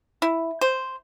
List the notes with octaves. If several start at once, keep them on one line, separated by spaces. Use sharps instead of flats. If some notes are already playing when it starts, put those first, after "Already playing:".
E4
C5